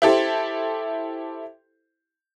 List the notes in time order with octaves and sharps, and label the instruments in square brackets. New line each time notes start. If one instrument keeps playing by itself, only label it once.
[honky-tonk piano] E4 G4 A4 C5